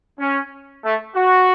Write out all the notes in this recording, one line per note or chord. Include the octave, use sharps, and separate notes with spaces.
C#4
A3
F#4